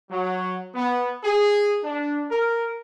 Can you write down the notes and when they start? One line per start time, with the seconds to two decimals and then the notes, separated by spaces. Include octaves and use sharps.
0.10 F#3
0.74 B3
1.24 G#4
1.83 D4
2.30 A#4